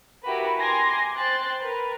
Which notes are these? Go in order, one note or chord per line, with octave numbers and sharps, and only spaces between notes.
E4 F#4 G4 A#4 B4 B5
G#5 A#5 C6 D6 G#6 A#6
C5 G5 C6 F#6 A6
A#4 B4